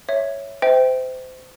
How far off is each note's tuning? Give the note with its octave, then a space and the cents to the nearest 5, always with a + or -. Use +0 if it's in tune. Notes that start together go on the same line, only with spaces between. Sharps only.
C#5 +0 E5 +0
C5 -30 E5 -40 G5 +0